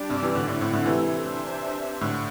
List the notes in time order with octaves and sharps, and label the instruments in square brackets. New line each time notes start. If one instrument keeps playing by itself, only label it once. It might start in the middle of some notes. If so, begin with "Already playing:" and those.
Already playing: [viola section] G3 D4 G4 D5
[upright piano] G2 C3
C3 E3
A2 D3
[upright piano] A2 D3 [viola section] A3 C4 E4
[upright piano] A2 D3
A2 D3
C3 E3
[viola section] D4 C5 E5
[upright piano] A2 D3